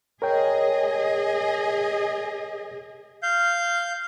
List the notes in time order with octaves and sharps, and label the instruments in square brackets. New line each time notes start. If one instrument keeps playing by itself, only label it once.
[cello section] G#4 D#5 [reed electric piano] A#4 C#5 G5
[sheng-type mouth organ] F5 G6